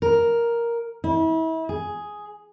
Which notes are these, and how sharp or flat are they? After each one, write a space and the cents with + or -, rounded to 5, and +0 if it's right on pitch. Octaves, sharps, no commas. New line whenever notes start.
A#4 +5
E4 -35
G#4 +5